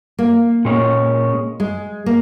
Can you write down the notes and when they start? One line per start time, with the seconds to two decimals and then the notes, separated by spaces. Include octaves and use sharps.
0.19 A#3
0.65 A#2 G#3 C#4
1.60 G#3
2.06 A#3